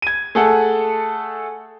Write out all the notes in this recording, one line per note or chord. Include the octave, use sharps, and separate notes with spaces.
G#6 D#7
A3 G#4 A4 F#5